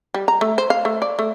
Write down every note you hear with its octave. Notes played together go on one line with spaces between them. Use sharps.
G3
A#5
A3
C5
F5
A3
D5
A3